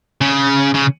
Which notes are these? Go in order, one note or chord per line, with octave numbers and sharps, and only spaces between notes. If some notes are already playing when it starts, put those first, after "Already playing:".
C#3
C#3